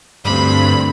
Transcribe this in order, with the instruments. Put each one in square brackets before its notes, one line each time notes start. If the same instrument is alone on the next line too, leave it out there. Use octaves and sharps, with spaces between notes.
[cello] D2 C4 [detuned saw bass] G2 [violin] B5